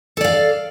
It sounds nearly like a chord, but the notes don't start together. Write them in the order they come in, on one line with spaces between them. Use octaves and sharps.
A4 D5 F5